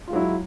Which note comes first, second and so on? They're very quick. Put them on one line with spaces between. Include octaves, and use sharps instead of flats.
F4 G#3 F#3 E4